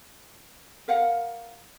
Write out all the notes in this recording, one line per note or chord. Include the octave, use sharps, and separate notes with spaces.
A#4 F5 F#5